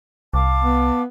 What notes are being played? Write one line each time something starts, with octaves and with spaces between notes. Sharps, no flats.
C2 F5 A5 D6
B3